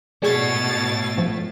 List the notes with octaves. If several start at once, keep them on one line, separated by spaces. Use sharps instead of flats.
B2 A3 G#4 C#5 D5 A6
A#1 G2 F3